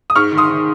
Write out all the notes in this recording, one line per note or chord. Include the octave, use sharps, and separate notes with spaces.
D#6
G#2 C#6 F6
D#3
C6 D#6
D#3